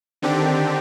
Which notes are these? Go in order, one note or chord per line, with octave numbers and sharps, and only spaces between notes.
D3 D#3 C4 D4 G4